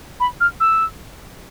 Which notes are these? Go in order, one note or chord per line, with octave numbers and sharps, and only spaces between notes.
B5
F6
E6